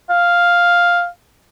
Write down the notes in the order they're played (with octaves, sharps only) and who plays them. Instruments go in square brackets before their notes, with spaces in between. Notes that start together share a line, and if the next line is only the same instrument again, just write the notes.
[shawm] F5